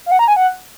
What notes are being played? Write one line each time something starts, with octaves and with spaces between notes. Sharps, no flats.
F5
F#5
A#5
G#5
F#5